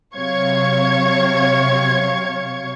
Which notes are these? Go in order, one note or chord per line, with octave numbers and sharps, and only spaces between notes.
C3 F#3 C#5 F5 C#6 G#6